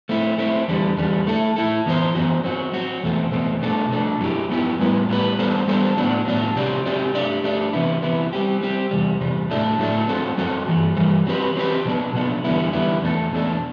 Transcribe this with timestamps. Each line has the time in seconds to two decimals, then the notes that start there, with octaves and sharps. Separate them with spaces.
0.09 A3 C4 E4
0.38 A3 C4 E4
0.68 E2 D3 G3
0.98 E2 D3 G3
1.27 A3 E4 A4
1.56 A3 E4 A4
1.86 F#2 E3 B3 F#4 C5
2.15 F#2 E3 B3 F#4 C5
2.44 F#3 C4 F#4
2.73 F#3 C4 F#4
3.03 E2 B2 A3 C4
3.32 E2 B2 A3 C4
3.61 B2 A3 D4 A4
3.91 B2 A3 D4 A4
4.20 F#2 F#3 B3 E4 G4
4.50 F#2 F#3 B3 E4 G4
4.79 A2 G3 B3 E4 B4
5.09 A2 G3 B3 E4 B4
5.39 G3 B3 D4 A4 C5
5.68 G3 B3 D4 A4 C5
5.97 A2 F#3 B3 D4
6.26 A2 F#3 B3 D4
6.56 C3 F#3 C4 G4 D5
6.86 C3 F#3 C4 G4 D5
7.15 A3 D4 G4 D5
7.44 A3 D4 G4 D5
7.73 C3 E3 B3 E4
8.03 C3 E3 B3 E4
8.33 G3 C4 G4
8.61 G3 C4 G4
8.91 E2 C3 G3
9.21 E2 C3 G3
9.50 A2 F#3 A3 D4
9.79 A2 F#3 A3 D4
10.09 F#2 F#3 C4 F#4 A4
10.38 F#2 F#3 C4 F#4 A4
10.67 G2 E3 G3
10.97 G2 E3 G3
11.27 F#3 C4 G4 B4
11.56 F#3 C4 G4 B4
11.85 B2 F#3 B3 D4
12.14 B2 F#3 B3 D4
12.44 E2 D3 G3 B3 E4
12.73 E2 D3 G3 B3 E4
13.02 E2 B2 A3 D4 A4
13.33 E2 B2 A3 D4 A4